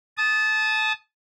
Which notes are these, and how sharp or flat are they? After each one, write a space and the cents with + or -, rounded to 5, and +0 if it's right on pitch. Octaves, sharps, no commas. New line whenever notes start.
A5 -20 D#6 +0